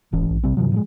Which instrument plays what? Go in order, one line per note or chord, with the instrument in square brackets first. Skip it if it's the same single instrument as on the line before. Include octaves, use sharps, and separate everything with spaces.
[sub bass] D#1 [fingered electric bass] G#1 E3 C#4
[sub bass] A#1
[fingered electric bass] C3 G3 C4
[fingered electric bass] G2 E3 F#3 [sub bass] C3
[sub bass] A2 [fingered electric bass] F3 F#3 G#3